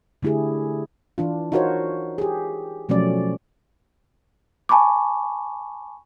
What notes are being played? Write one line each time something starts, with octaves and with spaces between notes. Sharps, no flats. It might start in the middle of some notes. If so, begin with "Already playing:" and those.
D3 A3 E4 G4 G#4
E3 D4 F4
D#4 F4 F#4 A#4 C5 C#5
G4 G#4
B2 F3 F#3 A3 C#4 D5
G#5 A5 B5 C#6 D6